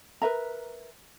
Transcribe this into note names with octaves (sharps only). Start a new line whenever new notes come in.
A#4 B4 E5 A#5